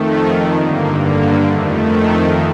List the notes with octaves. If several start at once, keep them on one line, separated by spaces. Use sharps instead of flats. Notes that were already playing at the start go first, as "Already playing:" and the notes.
Already playing: F2 D#3 A3
G2 D3 A#3
A#3
F2 D#3 A3